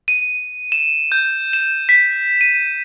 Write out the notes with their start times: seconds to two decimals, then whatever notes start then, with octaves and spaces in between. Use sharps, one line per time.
0.08 D#7
0.72 E7
1.12 G6
1.53 E7
1.89 B6
2.41 D#7